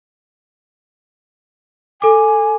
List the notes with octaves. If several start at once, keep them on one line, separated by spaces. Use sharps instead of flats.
A4 G#5 D6